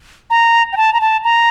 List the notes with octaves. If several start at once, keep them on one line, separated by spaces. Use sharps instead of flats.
A#5
G5
A5
A#5
A5
A#5